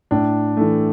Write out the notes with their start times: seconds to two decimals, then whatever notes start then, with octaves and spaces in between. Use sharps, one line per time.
0.11 A2 D4
0.57 E3 A3